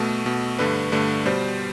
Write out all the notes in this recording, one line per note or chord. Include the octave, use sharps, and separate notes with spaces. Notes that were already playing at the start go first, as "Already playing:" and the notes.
Already playing: B2 A3 A4
B2 A3
G2 D3 A3 B4
G2 D3 A3
B2 G3 C5